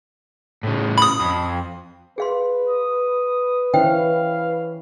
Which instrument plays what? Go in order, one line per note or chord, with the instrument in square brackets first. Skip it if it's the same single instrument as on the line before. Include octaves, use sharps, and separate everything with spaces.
[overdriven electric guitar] A2 C#3
[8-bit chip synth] B5 D#6
[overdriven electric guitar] F2
[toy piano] G#4 F5 C6 [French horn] B4
[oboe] D#6
[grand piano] E3 C#4 E4 [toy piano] C5 E5 G5 [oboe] F5